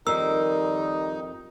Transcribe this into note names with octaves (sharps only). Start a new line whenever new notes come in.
F2 D#3 G3 D#4 A#4 E6